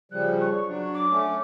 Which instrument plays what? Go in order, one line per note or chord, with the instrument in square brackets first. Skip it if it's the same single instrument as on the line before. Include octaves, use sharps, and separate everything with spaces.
[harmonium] C#3 F3 G3 [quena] F#6
[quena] C#6
[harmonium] F#3 D4
[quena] D6
[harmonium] A3 C#4